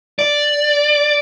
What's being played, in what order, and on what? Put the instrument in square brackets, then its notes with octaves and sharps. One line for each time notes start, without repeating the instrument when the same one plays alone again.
[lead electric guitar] D5